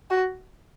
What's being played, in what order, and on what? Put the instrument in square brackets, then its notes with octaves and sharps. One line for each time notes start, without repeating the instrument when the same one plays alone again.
[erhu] F#4